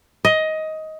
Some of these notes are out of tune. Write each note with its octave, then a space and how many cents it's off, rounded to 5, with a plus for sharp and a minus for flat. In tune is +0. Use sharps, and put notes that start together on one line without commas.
D#5 +15